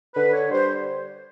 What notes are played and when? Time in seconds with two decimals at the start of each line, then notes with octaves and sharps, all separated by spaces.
0.15 D3 B4
0.33 C#5
0.51 G3 C5